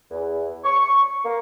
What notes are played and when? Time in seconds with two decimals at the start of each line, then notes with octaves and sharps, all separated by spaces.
0.11 E2
0.64 C#6
1.24 A#3